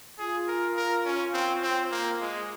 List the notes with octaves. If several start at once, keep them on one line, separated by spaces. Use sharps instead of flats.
F4 G#4
A#4
A#4
C#4
C4
C4
A#3
G#3